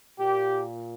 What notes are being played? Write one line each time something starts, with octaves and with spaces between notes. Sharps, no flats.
A#2 G4